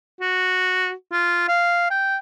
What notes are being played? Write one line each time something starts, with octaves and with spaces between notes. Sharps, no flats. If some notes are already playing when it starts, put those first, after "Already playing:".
F#4
F4
F5
G5